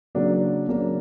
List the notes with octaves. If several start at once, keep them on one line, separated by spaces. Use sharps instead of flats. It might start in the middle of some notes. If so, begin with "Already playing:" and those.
C#3 F#3 A#3 D4
C#3 F#3 A#3 D4